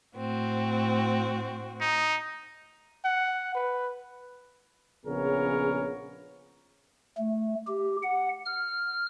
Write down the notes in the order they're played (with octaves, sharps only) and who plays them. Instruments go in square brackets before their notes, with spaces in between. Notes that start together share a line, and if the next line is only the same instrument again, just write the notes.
[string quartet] A2 C4 F#4
[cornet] D#4
[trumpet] F#5
B4
[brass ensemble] A#1 C#3 B3 G#4 A#4 C#5
[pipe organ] A3
G4
F#5
F6